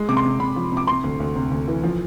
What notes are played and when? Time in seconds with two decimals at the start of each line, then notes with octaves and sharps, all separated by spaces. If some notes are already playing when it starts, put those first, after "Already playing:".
Already playing: G#3
0.09 C3 D6
0.17 C6
0.25 C3
0.39 C3 B5
0.56 F3
0.72 C3 D6
0.87 C3 C6
1.04 D2
1.20 D2
1.35 C3
1.51 D2
1.68 E3
1.83 F3